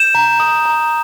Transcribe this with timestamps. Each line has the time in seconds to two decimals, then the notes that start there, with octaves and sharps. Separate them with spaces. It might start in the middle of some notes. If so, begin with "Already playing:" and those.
Already playing: G6 E7
0.15 A#5
0.40 D#6
0.66 A#5